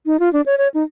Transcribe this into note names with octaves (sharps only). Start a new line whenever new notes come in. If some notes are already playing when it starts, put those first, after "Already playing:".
D#4
F4
D4
C#5
C#5
D#4